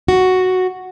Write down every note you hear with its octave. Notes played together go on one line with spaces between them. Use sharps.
F#4